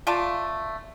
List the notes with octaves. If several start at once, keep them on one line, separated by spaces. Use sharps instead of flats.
A3 F4 D5 A5